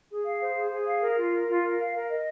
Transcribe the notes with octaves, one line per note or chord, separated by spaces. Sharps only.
G#4
F5
C5
G#4
G#4
F5
A#4
F4
A#4
F4
A#4
F5
A#4
D#5